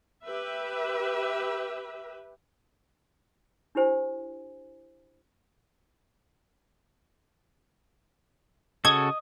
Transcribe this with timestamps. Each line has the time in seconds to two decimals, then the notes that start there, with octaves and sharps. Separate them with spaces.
0.25 G4 B4 E5
3.75 D4 E4 G4 C5 G#5
8.85 C#3 F#4 A4 D#5 G#6